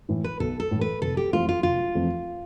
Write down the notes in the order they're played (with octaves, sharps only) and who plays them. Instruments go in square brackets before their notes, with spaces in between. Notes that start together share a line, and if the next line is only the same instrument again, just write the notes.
[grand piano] A2 E3
[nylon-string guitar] B4
[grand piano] B1 [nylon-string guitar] A4
[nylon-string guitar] A4
[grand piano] A2 E3
[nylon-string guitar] B4
[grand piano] F1 [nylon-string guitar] A4
[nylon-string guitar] G4
[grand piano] F2 E3 A3 C4 [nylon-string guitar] F4
[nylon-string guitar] F4
[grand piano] F1 [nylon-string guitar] F4
[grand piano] F2 E3 A3 C4